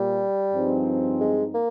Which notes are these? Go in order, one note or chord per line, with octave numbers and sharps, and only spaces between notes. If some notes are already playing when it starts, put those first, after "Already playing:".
Already playing: A#2 G3 G4
G2 F3 C4 D#4 G#4
G#3
A#3